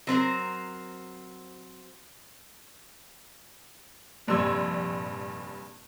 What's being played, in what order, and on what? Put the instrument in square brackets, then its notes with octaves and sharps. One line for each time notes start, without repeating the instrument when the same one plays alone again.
[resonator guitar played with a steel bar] F#3 C4 A#4 C5
[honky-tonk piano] F1 A#1 G2 C6 E6 G#6